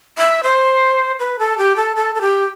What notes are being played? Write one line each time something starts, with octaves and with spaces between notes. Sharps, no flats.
E5
C5
B4
A4
G4
A4
A4
A4
G4